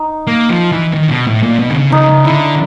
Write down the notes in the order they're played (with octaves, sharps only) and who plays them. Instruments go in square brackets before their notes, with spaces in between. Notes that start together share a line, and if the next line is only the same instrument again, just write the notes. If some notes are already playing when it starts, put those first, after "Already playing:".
Already playing: [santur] D#4
[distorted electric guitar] A#3
F3
E3
D#3
B2
A2
A#2
B2
D3
C#3
[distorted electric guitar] C#3 [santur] D#4
[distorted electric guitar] C#3
[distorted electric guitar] D3 [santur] E4